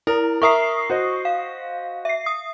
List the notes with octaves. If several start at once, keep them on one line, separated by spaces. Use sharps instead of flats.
E4 A#4
A#4 E5 A#5 C#6 D#6 C7
F#4 C5 D#5
F5
E5 C7
D#6